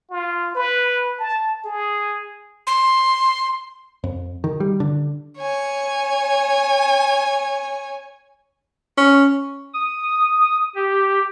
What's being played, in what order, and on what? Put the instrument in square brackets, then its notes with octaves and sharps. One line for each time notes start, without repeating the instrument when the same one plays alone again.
[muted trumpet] F4
B4
A5
G#4
[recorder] C6
[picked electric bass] F2
D#3
G3
D3
[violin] C#5 G#5
[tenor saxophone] C#4
[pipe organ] D#6
G4